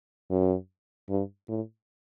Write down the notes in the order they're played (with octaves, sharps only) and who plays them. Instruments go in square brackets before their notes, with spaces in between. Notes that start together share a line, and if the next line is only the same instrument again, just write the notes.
[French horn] F#2
G2
A2